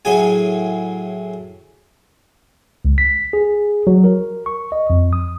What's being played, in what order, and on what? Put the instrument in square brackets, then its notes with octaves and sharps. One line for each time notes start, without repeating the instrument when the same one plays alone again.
[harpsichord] A2 F#3 G#4 G#5
[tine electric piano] C#2
B6
G#4
F#3
A#4
C#6
D#5
F2
D#6